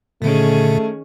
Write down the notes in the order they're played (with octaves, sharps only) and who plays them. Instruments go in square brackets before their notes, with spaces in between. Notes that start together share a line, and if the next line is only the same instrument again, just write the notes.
[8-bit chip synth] A#2 D3 [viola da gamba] D#3 C#4 G#4 [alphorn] A3